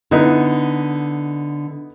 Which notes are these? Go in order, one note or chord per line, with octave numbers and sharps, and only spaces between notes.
D3 B3 D#4 E4